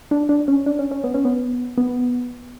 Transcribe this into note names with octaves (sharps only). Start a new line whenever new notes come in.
D4
D4
C#4
D4
C#4
C#4
B3
C#4
B3
B3